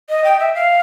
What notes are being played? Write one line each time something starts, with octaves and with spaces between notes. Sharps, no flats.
D#5
G5
E5
F5